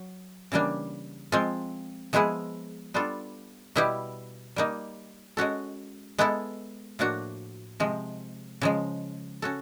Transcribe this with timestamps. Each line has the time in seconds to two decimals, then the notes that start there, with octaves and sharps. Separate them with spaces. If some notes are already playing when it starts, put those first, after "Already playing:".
Already playing: F#3
0.52 C#3 E3 G3 A#3 D4
1.32 F3 G#3 C4 F4
2.13 F3 G#3 B3 E4 G#4
2.94 G3 B3 D4 F4 A4
3.76 B2 G3 B3 E4 G4
4.56 G3 A#3 D#4
5.37 G#3 C#4 F#4 A4
6.18 G#3 B3 E4 A4
6.99 A2 F3 A#3 D4 F#4
7.80 C3 F3 G#3
8.61 C#3 F3 G#3
9.42 C#4 F#4 A4